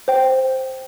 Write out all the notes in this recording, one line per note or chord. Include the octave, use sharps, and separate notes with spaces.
C5 G5